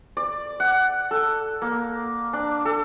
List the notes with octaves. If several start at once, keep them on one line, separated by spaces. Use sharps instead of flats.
D5
F#5
A4
A#3
D4
A4